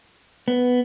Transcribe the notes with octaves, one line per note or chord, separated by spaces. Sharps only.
B3